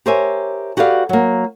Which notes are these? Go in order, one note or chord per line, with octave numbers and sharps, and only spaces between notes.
G4 A#4 C5 C#5 E5 G#5
F#4 G4 A4 B4 D5 F5
F#3 A#3